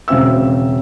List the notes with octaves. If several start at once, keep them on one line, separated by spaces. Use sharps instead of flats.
E1 C#3 C4 E5 E6